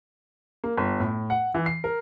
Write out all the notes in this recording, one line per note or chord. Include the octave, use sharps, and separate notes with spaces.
A#3
G1
A2
F#5
E3
C7
A#4